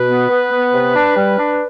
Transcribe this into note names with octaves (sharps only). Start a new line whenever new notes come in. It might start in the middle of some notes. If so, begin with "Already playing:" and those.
Already playing: B2 B4
B3
B3
B3
C3
D4
G3
D4